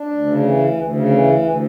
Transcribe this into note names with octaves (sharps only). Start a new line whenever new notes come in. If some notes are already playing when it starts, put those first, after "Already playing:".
Already playing: D4
D2
C#3
E3
D2
D2
C#3
E3
D2
D2